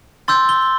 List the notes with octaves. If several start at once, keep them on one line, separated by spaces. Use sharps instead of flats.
C6 E6 G6 A6
G7